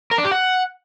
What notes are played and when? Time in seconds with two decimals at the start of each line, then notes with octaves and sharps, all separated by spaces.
0.11 A#4
0.18 D4
0.25 G4
0.31 F#5